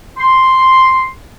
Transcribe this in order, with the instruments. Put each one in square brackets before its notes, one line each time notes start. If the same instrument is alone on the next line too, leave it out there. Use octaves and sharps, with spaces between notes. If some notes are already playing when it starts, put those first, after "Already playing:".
[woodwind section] C6